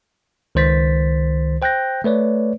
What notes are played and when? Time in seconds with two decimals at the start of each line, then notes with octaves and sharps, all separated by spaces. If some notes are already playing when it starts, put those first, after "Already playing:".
0.55 C#2 D#3 C5 A6 B6
1.62 C5 G5 F#6 G6 A#6
2.04 A3 B4 C#5 D5